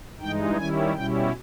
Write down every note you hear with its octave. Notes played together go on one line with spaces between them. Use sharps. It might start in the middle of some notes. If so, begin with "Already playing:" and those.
G2 E3 G#3 D#4 G5
D#3 G3 C#4 E4 G#5
B2 G3 C#4 E4 G5